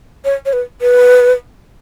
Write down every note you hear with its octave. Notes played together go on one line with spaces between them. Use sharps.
C#5
C#5
B4
B4